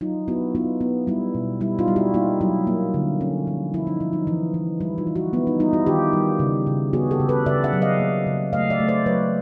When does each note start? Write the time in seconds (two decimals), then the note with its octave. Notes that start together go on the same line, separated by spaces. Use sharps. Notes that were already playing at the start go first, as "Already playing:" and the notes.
0.01 F#3 D#4 F4
0.28 B3 E4 F#4
0.55 B3 D#4 F4
0.81 B3
1.07 G3 E4
1.35 B2
1.61 G3 E4
1.78 D#4 F4
1.88 G3
1.96 E4 F#4
2.14 A#3 D#4 F4
2.41 F#3 E4
2.67 A#3
2.94 D3
3.21 C#4
3.47 F3
3.74 F3 E4
3.87 D#4
4.00 F3
4.13 D#4
4.27 E3
4.54 E3
4.81 G3 E4
4.98 D#4 F4
5.07 E3
5.16 E4 F#4
5.33 B3 E4
5.47 D#4
5.60 G3 D#4 F4
5.73 E4 F#4
5.86 D#3 F4 G4
6.13 G3
6.39 C#3
6.67 C#3
6.93 B3 F#4 G#4
7.11 G4 A4
7.20 C#3
7.29 A4 B4
7.46 C#3 D5 E5
7.64 E5 F#5
7.73 F#3
7.82 D#5 F5
8.00 A#3
8.27 C#3
8.53 A3 D#5 F5
8.70 D5 E5
8.80 A3
8.88 C5 D5
9.06 F#3 B4 C#5